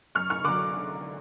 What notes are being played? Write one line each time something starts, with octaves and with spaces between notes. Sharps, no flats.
F#2 C#6 F6
C#6 F6
D3 F#3 D6 F#6